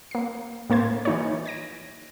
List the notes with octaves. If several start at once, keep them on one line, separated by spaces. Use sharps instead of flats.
A#3 C7
A2 A#3 C5 G#6
E3 D#4 C#5
G#6 A#6 D7